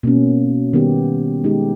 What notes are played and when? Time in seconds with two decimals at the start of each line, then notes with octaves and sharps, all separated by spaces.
0.03 B2 A#3 C#4
0.73 D#3 G3 B3 G4
1.44 G#3 D#4 G4